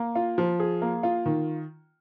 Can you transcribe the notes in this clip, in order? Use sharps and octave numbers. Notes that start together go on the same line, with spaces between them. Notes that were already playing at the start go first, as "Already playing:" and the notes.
Already playing: A#3
F4
F3
G#4
A#3
F4
D#3